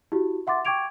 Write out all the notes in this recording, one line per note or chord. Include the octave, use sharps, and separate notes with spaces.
E4 F#4 G4
E5 F#5 C6 D6 A6
G5 C#6 D6 G#6 D7 F7